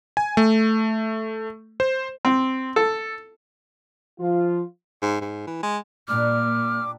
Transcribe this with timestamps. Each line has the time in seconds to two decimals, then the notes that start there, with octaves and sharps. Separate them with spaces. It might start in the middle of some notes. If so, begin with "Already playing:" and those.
0.17 G#5
0.37 A3
1.80 C5
2.25 C4
2.76 A4
4.19 F3 F4
5.02 G#2
5.21 G#2
5.47 E3
5.63 G#3
6.08 A#2 G3 D4 D6 F6